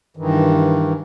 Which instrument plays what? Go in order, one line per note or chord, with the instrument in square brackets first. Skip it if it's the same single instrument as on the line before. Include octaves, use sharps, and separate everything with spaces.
[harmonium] G2 D#3 E3